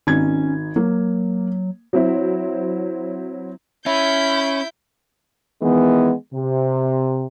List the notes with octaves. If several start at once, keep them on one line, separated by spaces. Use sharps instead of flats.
G#1 C#4 D#4 G#6
F#3 A#3
F#3 C4 E4
C#4 E4 E5 B5 G6
D#3 E3 G#3 B3
C3